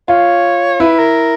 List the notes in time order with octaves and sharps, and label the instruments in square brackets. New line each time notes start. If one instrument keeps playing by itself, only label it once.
[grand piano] F4 [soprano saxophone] C#5
[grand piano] E4 [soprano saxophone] B4
[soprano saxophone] A#4